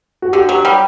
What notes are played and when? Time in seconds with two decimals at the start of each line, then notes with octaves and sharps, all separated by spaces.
0.22 F#4
0.33 D3 G4
0.49 F#3 G4
0.65 G3